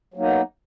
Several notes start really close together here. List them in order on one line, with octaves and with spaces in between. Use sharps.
F#3 A#3 D#4 B3